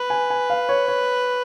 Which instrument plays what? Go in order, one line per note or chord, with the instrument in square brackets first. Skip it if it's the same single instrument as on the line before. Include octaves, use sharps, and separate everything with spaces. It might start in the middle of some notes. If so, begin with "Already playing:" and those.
Already playing: [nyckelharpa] B4
[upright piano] G#5
G#5
F5
C#5
C#5